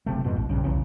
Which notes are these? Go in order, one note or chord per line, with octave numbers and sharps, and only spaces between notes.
F#1 C3 A3
F2 G#2 B2
A1
A#1 G2 C#3
B1 E2 C#3